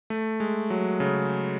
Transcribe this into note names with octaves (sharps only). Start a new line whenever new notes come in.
A3
G#3
F#3
C#3